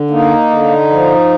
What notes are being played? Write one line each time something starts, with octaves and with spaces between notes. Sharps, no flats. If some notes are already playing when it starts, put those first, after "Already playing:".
Already playing: D3
A#3 D#4
D3
F3